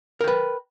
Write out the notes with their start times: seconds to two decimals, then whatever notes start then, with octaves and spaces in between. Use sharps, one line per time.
0.21 A#4
0.24 G5
0.28 B4